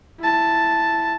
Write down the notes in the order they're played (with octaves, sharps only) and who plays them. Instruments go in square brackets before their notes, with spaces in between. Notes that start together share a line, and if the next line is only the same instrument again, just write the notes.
[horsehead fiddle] E4 A5